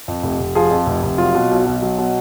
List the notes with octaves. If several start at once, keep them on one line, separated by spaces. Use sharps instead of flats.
F2
F1
F1
F3 G#4
F2
F1
F1
F#3 F4
B2
B1
B1
F#3
B2